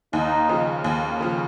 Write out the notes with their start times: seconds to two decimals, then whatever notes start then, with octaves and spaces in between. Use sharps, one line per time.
0.13 D#2 D#4
0.49 C#3 F3
0.84 D#2
1.20 C#3 F3